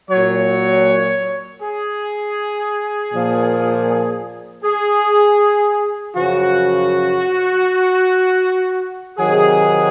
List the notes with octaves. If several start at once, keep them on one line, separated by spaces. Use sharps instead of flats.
A#2 F#3 C#5
G#4
A#2 F3
G#4
F#2 C#3 F3 F#4
C3 D#3 F#3 G#4